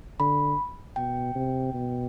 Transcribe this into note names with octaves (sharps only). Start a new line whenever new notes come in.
D3 B5
B2 G5
C3
B2